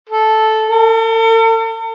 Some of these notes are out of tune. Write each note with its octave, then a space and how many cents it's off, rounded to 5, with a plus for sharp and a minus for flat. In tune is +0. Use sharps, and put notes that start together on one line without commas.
A4 -10
A4 +45